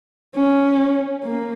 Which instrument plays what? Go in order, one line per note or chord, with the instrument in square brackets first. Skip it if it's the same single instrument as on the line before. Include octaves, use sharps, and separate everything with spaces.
[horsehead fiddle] C#4
A#3